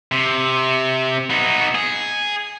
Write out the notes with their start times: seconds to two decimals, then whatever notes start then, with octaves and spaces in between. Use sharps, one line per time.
0.12 C3
1.30 B3 D#4
1.75 G#4